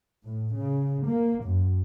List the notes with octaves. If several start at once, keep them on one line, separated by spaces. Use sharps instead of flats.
A2
C#3
A#3
F#2